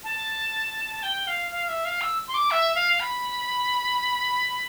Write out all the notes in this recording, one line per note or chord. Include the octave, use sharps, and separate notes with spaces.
A5
G5
F5
F5
E5
F5
E6
C6
D6
E5
F5
B5